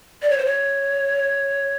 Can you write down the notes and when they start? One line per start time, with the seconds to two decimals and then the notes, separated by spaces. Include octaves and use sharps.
0.22 D5
0.30 C#5
0.38 C5
0.45 C#5